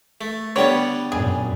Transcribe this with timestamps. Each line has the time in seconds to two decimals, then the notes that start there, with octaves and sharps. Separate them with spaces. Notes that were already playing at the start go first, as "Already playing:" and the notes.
0.21 A3
0.56 D3 G3 B3 C#5
1.12 F#2 A#2 G#4